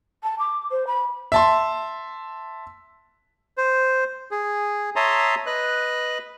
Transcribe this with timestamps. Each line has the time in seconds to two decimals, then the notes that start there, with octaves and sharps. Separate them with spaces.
0.23 A5
0.39 D6
0.71 C5
0.87 B5
1.32 E5 A5 C6
3.58 C5
4.31 G#4
4.96 C#5 E5 A5 A#5 C6 D#6
5.46 B4 D#5 F#6